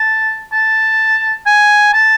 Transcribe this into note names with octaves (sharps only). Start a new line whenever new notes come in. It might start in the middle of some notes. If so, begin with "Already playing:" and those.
Already playing: A5
A5
G#5
A5